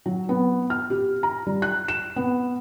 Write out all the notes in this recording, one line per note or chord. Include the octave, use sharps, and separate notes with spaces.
F#3
B3
F6
G4
A#5
G3
F#6
E7
B3